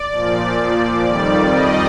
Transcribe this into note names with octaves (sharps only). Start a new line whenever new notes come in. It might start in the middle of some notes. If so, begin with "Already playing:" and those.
Already playing: D5
A#2 F3
F2 D#3 G3 D5
D#5